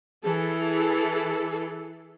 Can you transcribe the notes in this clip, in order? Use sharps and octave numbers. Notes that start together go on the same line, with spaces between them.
E3 G#4 A4